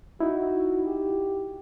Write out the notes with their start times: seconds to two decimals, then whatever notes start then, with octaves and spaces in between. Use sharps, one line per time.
0.20 D#4 E4 F#4
0.85 G4